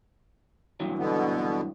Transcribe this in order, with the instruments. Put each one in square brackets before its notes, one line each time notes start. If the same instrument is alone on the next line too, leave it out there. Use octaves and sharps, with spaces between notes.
[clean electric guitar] G2 E3 F#3
[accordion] B2 D3 B3